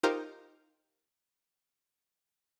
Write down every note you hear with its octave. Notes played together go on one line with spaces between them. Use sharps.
D#4 F4 G4 A#4 C5